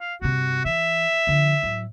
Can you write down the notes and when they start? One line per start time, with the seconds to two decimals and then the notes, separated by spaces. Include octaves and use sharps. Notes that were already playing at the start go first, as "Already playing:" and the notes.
0.01 F5
0.22 G2 C3 F#4
0.65 E3 E5
1.27 D3 F3
1.63 A2 F#3